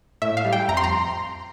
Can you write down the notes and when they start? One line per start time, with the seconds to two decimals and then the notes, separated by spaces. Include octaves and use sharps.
0.22 A2 E5
0.37 F5
0.45 G3
0.53 G5
0.68 F2 A#5
0.77 C6
0.84 A#5